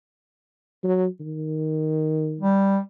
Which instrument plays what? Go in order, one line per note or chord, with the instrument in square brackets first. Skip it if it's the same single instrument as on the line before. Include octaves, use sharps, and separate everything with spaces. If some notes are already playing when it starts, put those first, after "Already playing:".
[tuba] F#3
D#3
[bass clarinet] G3